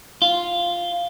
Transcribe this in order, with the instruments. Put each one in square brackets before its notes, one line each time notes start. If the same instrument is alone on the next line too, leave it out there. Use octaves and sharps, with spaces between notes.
[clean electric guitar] F4